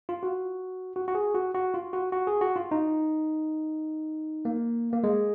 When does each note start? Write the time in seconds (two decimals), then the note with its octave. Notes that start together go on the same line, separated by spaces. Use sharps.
0.09 F4
0.23 F#4
0.96 F#4
1.08 F#4
1.15 G#4
1.34 F#4
1.54 F#4
1.74 F4
1.93 F#4
2.12 F#4
2.27 G#4
2.41 F#4
2.56 F4
2.71 D#4
4.45 A#3
4.93 A#3
5.04 G#3